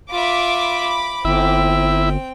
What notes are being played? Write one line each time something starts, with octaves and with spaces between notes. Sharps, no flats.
F4 E5 B5 D6
G1 C4 E4 E5 G5